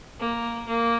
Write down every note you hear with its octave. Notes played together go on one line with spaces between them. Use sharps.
A#3
A#3